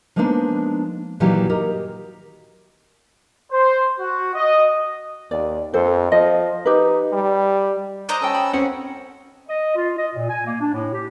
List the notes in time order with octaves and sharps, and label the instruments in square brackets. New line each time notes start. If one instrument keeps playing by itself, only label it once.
[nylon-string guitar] F3 G#3 A#3 B3 D4 D#4
A#2 D#3 E3 F#3 F4 G4
G4 A#4 D#5
[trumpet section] C5
F#4
D#5
[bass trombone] D#2 [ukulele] D5
[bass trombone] F2 [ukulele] A4 C5
[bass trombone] F3 [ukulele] D#5
[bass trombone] D#4 [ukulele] G4 B4
[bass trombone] G3
[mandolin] C5 D#5 A#5 [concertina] D6 F#6
[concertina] C#4 A4 E6 [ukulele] G5 A5
[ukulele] B5
[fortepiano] C4 C#4 [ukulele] F#5
[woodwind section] D#5
F4
D#5
A#2
G#5
A#3
D4
A2
G4